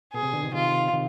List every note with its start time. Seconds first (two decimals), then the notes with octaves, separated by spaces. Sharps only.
0.13 B2 G#4
0.23 C3
0.33 B2 D3
0.43 C3 D#3
0.53 C3 D#3 F4
0.93 C3 D#3